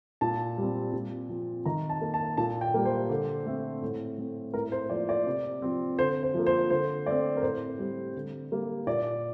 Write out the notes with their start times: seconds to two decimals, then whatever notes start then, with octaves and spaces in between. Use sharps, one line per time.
0.21 A#2 A5
0.57 G3 C4
0.93 A#2
1.29 F3 C4
1.66 D#3 A#5
1.89 A5
2.01 A#3
2.14 A5
2.37 A#2 A5
2.61 G5
2.74 G3 A#3
2.85 C5
3.09 D3
3.46 A3 C4
3.82 A2
4.18 A3 C4
4.54 A2 A#4
4.72 C5
4.90 F3 A#3 D5
5.09 D5
5.27 C3
5.62 F3 C4
5.98 D3 C5
6.23 C5
6.34 F3 A#3
6.46 C5
6.70 D3 C5
7.06 A3 C4 D5
7.37 A#4
7.42 A2 C5
7.78 G3 C4
8.15 D3
8.51 G3 A#3
8.87 A#2 D5